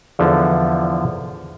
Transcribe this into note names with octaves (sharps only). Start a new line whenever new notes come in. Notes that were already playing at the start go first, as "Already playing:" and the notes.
E2 D3 F3